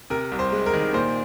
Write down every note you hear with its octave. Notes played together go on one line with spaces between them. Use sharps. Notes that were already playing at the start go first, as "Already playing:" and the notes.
C3 A#4
C2
C5
G#3
A#4
D#3
A#2 C5